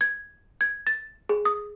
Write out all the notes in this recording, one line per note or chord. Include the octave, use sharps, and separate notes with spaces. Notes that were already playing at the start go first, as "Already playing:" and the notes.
G#6
G#6
A6
G#4
D#6